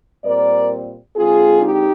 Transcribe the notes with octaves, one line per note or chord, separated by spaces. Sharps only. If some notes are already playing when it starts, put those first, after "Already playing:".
A#2 G3 C4 A#4 D5
D3 G#3 C4 F4 G#4
D#4 G4